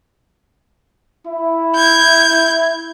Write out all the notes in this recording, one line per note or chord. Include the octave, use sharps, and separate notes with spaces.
E4
G6 G#6